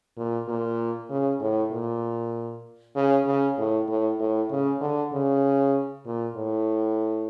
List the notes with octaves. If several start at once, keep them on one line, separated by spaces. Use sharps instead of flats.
A#2
A#2
C#3
A2
A#2
C#3
C#3
A2
A2
A2
C#3
D3
C#3
A#2
A2